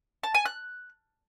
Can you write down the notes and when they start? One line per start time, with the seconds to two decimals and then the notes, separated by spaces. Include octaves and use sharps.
0.23 A5
0.34 G#5
0.46 F#6